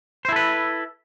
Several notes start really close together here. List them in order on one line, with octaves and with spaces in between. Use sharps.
C5 E4 A4 B4